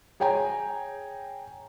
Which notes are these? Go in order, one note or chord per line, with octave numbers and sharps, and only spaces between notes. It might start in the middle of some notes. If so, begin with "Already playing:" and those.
G#4 C#5 G5 G#5 A#5